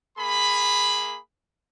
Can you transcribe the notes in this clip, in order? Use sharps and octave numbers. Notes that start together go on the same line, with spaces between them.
A#3 G#4 B5